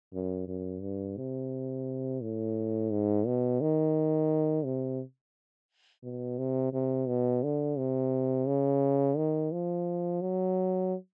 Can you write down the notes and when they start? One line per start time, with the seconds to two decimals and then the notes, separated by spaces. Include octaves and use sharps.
0.14 F#2
0.48 F#2
0.82 G2
1.17 C3
2.22 A2
2.91 G#2
3.27 B2
3.62 D#3
4.65 C3
6.04 B2
6.39 C3
6.73 C3
7.08 B2
7.44 D3
7.78 C3
8.47 C#3
9.17 D#3
9.52 F3
10.22 F#3